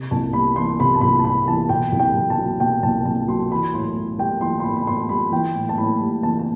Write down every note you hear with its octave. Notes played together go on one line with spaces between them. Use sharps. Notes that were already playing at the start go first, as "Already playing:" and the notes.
Already playing: C3
C2 A5
G3 B5
E3 C6
C3 B5
A5
C2 B5
A5
G3 B5
E3 A5
B2 G5
C2
G5
C2
A5
F#3
B2 G5
C2 A5
C2 A5
F#3 C6
E3 B5
A2 C6
A2
G3 G5
E3 C6
C6
A2 B5
B5
A2 C6
G3 B5
E3 G5
A2
A5
A2 B5
G3
E3 A5
A5